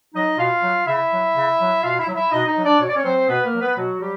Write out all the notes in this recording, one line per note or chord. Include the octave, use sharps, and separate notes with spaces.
F#3 D#4 D#5
B2 F4 F5
F#3
C#3 E4 E5
F#3
C#3
F#3
B2 F4 F5
E4 E5
F#3
E4 E5
B2 D#4 D#5
D#4 D#5
F#3
D4 D5
B2 C#5
D5
C#4 C#5
F#3 C4 C5
B2 B3 B4
A#3 A#4
F#3
B3 B4
B2 F#3 F#4
F#3 G3 G4